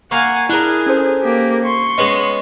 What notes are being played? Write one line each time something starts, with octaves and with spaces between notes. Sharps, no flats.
A#3 F5 F#5 G#5 C#6
D4 E4 G#4 A#4 F#6
C#4 A4 C5
A#3 G4
C6 C#6
G#3 B3 C#4 D#5